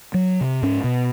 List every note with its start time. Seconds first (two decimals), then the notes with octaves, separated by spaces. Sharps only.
0.14 F#3
0.41 C3
0.62 G#2 C#4
0.84 B2